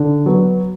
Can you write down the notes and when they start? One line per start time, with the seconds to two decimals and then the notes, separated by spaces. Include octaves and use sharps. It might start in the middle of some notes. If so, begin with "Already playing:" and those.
Already playing: D3
0.26 F#3 B3